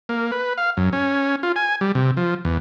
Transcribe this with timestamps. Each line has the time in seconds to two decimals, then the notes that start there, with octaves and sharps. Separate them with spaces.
0.09 A#3
0.32 B4
0.58 F5
0.77 F#2
0.93 C#4
1.43 F4
1.56 G#5
1.81 G3
1.95 C3
2.17 F3
2.45 E2